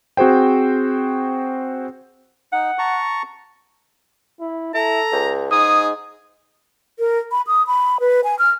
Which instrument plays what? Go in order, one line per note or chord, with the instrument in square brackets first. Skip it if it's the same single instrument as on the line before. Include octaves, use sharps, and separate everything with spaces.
[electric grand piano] C4 F#4 G#4 C5 G5
[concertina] D#4 [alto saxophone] F#5
[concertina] A5 A#5 C#6
[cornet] E4
[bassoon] E4 [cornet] A4 [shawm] A#5
[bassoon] C#2
[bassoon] G#2 [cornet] D#4 [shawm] G#4 [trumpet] D#6
[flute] A#4
B5
D#6
B5
B4
G#5
F6